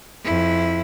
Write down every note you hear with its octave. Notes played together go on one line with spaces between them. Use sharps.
F2 E4